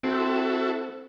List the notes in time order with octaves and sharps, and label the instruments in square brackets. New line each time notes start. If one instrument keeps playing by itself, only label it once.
[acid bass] C4 [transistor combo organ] E4 F#4 A4